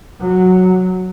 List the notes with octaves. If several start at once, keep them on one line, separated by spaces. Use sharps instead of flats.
F#3